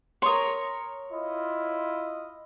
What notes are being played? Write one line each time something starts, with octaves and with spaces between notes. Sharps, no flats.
A#4 C#5 C6 D#6
E4 F4 D#5